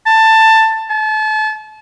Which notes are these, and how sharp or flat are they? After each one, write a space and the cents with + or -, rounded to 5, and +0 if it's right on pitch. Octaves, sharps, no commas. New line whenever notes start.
A5 +15
A5 -30